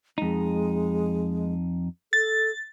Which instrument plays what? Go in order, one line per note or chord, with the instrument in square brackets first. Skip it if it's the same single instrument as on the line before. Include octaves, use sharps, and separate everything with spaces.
[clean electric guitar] F2 D#4 [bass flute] G#3
[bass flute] A4 [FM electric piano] A6